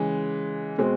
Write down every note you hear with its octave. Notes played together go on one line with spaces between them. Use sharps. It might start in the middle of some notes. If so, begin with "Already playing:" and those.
Already playing: C#3 E3 G#3
B2 G#3 C4